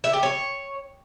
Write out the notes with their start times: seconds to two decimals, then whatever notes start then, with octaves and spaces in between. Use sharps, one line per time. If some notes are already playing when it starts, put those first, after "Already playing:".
0.04 E5
0.13 G4
0.23 C#5